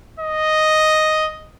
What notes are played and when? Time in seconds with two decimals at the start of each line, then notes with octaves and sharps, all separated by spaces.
0.20 D#5